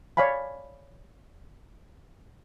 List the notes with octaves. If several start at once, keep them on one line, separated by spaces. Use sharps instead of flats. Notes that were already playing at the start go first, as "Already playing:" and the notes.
C#5 D5 F5 G#5 B5